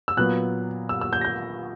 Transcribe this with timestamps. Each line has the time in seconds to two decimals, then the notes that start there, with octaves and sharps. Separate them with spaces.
0.08 E6
0.17 A#2 F#3 B3 F#6
0.89 E6
1.01 E6
1.13 G6
1.21 A#6
1.25 G6